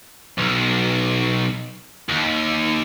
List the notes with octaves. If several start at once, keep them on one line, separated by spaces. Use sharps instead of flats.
B1
D#2